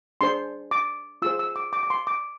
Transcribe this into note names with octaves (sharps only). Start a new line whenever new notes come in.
D4 G#4 C5 C6
D6
F4 G#4 C5 E6
E6
D6
D6
D6
C6
D6